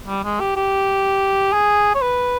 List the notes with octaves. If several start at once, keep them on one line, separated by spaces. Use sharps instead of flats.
G3
G#3
G4
G4
G#4
C#5
B4